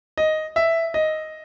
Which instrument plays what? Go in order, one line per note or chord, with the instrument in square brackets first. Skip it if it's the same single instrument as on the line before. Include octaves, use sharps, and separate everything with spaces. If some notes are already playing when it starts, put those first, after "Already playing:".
[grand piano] D#5
E5
D#5